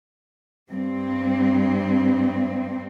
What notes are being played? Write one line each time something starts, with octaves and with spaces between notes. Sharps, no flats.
G2 C4